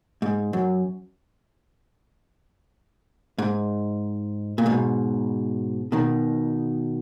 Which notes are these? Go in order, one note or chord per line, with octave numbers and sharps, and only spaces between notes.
G#2
F#2
G#2
A#2
G#2 B2
B2 D#3